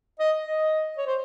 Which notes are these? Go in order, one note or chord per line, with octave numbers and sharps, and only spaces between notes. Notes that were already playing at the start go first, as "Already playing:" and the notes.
D#5
D#5
C#5
C5